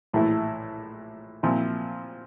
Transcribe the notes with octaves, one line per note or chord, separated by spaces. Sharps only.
A#1 A2 E3 A3 E4
A#2 F3 C4 E4